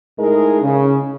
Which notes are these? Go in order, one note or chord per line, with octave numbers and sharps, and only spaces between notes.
A2 G#3 D#4 G#4 A#4
C#3